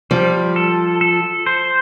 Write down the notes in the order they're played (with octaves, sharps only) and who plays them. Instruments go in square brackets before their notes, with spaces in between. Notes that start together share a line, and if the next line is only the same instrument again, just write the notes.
[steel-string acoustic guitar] F3 [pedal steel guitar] G3
[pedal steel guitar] A4
A4
C5